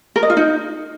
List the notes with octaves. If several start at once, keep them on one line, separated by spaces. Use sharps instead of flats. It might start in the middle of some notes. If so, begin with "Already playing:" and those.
A#4
D#5
F4
D#4